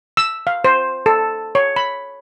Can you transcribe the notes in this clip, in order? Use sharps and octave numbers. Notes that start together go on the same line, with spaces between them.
E6
F5
C5
A4
C#5
B5